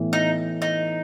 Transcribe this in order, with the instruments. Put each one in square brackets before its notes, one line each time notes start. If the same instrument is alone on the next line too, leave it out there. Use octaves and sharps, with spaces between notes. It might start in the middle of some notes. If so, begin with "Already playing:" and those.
Already playing: [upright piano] A2 E3 B3
[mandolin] D#4
D#4